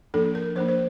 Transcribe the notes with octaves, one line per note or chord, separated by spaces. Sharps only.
F3 A#3 D4 A4
A#4
F3 A#3 D4 C5
C5